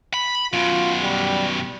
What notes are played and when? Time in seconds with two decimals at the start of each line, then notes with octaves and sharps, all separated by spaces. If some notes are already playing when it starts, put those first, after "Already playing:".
0.14 B5
0.53 F#2 B2 F4
1.01 G3